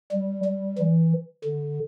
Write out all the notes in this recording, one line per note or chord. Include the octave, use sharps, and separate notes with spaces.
G3
G3
E3
D3